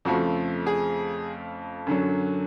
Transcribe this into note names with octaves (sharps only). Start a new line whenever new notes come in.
F2 C#3 F3 A3 F#4
G#4
F#2 D3 F#3